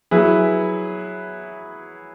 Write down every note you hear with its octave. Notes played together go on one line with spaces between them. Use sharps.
F#3 E4 G#4 B4